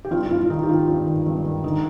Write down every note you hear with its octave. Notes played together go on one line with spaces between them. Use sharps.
G4
G2 F4
G2 F4
F4
D#3 D#4
G4
D#3 F4
G2 F4
D#3
G2
D#3
D3 D#4